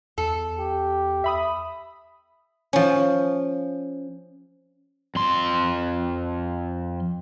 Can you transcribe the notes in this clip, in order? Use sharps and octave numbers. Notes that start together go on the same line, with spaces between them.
E2 A4
G4
E5 B5 D#6
F3 C#4
F2 C6